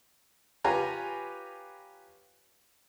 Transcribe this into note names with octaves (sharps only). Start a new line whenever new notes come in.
F4 G4 B4 C#5 G#5 A#5